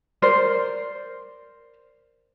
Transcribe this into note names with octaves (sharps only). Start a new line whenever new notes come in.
A#4 C5 D5